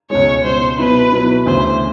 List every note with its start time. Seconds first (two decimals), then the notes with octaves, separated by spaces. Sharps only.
0.10 C#2 B2 G#3 C#5
0.44 C#2 B2 G#3 C5
0.78 B2 F#3 B3 E4 B4
1.12 B2 F#3 B3 E4
1.46 D2 C#3 E3 C5